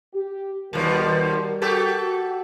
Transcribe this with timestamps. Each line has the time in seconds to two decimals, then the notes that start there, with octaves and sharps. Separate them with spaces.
0.14 G4
0.73 D#2 B2 F3 G3 A#4
1.62 F#4 G4 A4